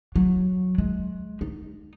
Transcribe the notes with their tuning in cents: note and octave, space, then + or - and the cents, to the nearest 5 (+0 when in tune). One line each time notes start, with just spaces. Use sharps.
F#3 -10
G#3 +30
D#4 -15